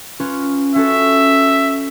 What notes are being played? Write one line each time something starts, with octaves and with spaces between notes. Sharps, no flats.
C#4 F4 B4
C#4 F#4 A4 E5
A#6